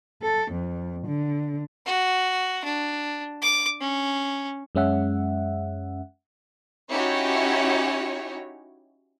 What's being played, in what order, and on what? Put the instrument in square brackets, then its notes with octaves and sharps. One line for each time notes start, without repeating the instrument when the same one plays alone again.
[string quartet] A4
F2
D3
[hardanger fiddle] F#4
D4
D6
C#4
[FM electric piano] F#2 G#3 C#4 E5 F#5
[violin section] C#4 D#4 E4 F#4 G4 C#5